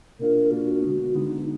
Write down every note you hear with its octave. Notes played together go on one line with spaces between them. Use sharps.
B2 A#3 D4 F4 A#4
B2 A#3 D4 F4 F#4
D3 G#3 B3
D3 G#3 B3 D#4